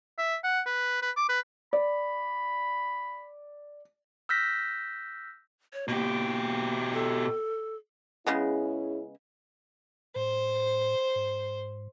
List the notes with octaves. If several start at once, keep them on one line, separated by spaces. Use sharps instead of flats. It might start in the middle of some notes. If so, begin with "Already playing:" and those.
E5
F#5
B4
B4
D6
B4
D5 B5
E6 F6 G6 A#6 B6
C#5
B2 A#3 G4
A4
C#3 G#3 B3 C#4 E4 G#4
A2 C5
G#2